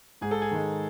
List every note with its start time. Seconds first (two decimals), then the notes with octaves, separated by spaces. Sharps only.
0.21 G#2 G#4
0.31 A4
0.42 G#4
0.51 D#3 G#3